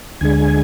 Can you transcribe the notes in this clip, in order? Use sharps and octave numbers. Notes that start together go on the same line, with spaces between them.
D2 D3 G#3 G#5